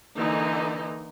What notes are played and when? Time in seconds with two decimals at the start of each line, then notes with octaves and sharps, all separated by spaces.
0.16 D3 E3 A#3 D#4